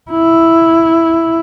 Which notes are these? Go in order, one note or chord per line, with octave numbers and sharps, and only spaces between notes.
E4